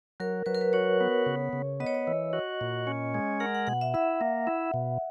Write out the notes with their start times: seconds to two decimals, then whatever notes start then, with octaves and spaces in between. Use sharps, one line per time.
0.20 F#3 A#4
0.46 F#3 B4
0.55 A#4
0.61 B4
0.73 F#4 C#5
1.00 B3
1.26 C#3
1.53 C#3
1.80 B3 D#5
1.87 C#5
1.95 D#5
2.07 E3
2.33 F#4
2.61 A#2
2.87 C#4
3.14 G#3
3.40 A#4 F#5
3.55 F#5
3.67 B2 F#5
3.81 E5
3.94 E4 E5
4.21 A#3
4.47 E4
4.74 B2